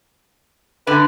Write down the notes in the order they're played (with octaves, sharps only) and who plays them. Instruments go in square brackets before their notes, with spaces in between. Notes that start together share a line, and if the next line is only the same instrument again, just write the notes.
[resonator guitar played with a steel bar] D3 [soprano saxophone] B4